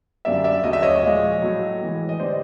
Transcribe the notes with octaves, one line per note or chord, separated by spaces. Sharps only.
F#2 D3 G3 A#3 D5 E5
D5 E5
D#2 C#3 F#3 A3 D#5
E5
C#5 D#5
A#2 F3 G#3
A2 F#3 A3
A2 E3 G#3
D#5
D3 G3 C5 D5